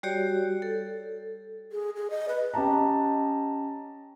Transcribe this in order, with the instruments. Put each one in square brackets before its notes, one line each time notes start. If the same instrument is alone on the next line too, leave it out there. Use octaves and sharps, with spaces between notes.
[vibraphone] G3 F#4 G4 C#5 D5
A4
[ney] G#4
G#4
D#5
B4
[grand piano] C#4 G4 D#5 A5 A#5